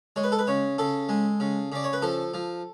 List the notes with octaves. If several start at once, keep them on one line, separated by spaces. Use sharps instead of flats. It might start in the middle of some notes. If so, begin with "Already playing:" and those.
G#3 C#5
B4
A4
B4
C#3 C#5
C#3 A4
G#3
C#3
C#3 D5
C#5
B4
F3 A4
F3